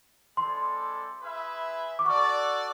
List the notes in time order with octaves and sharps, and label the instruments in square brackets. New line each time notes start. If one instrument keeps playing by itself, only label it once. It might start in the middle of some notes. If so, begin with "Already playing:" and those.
[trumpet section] G#3 C4 E4 A4 D5 [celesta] C6
[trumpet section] E4 G#4 B4 E5
[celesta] D6
[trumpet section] F#4 A4 D5 [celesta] C#6